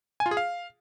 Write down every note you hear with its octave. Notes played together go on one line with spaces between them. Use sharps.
G#5
F4
G#4
F5